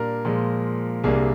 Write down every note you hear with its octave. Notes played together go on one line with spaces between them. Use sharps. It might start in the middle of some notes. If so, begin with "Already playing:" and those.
Already playing: A#2 G3 D4 A#4
A#2 F3 G#3
C2 C3 G3 A#3 D4 G#4